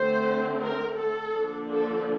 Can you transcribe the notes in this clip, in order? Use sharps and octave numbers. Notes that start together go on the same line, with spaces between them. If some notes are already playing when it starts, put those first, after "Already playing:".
Already playing: D3 A3 C4 C5
A#4
A4
D3 F3 A#3 D4
A4